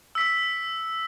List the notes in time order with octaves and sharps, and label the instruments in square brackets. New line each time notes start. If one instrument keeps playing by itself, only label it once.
[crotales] E6 B6